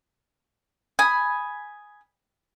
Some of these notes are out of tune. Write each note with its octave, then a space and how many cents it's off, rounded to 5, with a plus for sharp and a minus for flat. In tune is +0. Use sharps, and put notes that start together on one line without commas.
G#5 +5 B5 +0 D#6 +0